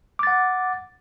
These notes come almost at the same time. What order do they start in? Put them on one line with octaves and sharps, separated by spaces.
D6 A6 F#5